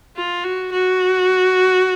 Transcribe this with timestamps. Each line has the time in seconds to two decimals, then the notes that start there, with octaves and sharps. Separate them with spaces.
0.16 F4
0.44 F#4
0.72 F#4